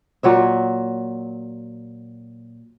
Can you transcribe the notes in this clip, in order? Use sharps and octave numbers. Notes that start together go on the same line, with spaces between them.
A#2 F#3 C#5 E5